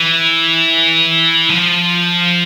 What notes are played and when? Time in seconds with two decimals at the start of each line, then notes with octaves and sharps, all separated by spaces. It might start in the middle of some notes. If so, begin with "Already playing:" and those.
Already playing: E3
1.50 F3